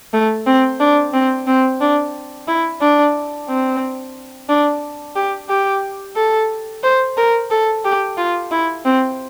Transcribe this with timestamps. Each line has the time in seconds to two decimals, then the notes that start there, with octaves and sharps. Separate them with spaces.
0.13 A3
0.47 C4
0.80 D4
1.14 C4
1.47 C4
1.81 D4
2.48 E4
2.81 D4
3.48 C4
4.49 D4
5.16 G4
5.49 G4
6.16 A4
6.83 C5
7.17 A#4
7.51 A4
7.85 G4
8.18 F4
8.51 E4
8.85 C4